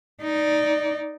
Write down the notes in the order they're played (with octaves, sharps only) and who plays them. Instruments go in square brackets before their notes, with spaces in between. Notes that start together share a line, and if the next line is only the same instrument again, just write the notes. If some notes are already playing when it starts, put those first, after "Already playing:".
[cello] D#4 D5